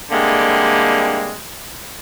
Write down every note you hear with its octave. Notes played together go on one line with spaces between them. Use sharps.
D3 G3 G#3 A#3 C4 E4